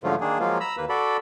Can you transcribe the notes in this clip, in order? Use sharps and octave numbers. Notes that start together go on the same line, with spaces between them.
G#2 D3 F3 F#3 A3 F4
D#3 A#3 D4 G#4
F3 F#3 G#3 A#3 F4
A#5 B5 E6
D#2 A#3 B4
F#4 A4 D5 B5